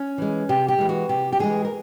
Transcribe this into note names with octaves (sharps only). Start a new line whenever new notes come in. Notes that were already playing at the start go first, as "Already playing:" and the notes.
Already playing: C#4
E3 G#3
C3 G4
G4
E3 G#3
F#4
C3 G4
G4
E3 G#3 G#4
A#4